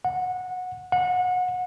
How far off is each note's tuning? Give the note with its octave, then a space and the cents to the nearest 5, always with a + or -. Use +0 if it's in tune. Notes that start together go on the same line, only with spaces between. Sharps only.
F#5 -15
F#5 -25